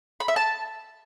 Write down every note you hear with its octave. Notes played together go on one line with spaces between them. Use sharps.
B5
E5
A5